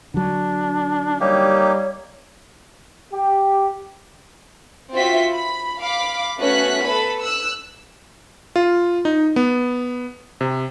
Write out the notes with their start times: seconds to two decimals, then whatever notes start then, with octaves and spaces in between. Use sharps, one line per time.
0.14 D3 F#3 D4
1.20 G3 A#3 D#4 G4 C#5
3.12 G4
4.94 C4 F4 F#4 E5 B6
5.33 B5
5.81 F5 B5 D6
6.39 A3 B3 C#4 F#4 F#6 B6
6.84 A4 B4 B5
7.20 E6 F#6
8.56 F4
9.05 D#4
9.36 B3
10.41 C3